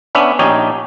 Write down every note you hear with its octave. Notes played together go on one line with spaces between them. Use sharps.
B3 C#4 D4 E5
A#1 C#4 D#4 G4 D5 G#5